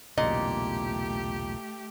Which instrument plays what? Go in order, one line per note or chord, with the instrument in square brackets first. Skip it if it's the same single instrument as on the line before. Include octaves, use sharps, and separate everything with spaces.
[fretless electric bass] B1 E2 C#3 [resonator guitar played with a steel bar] A#2 [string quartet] A3 G4 [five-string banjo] D#5